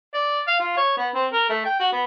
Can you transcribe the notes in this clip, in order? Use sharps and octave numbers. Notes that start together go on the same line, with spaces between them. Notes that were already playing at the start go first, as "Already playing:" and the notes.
D5
F5
F4
C#5
B3
C4
A#4
A3
G5
F#4
B3